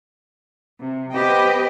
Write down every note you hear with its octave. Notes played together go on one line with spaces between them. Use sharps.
C3
B3 G4 B4 C5 D#5 G5